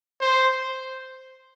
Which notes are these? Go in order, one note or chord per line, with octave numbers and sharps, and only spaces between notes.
C5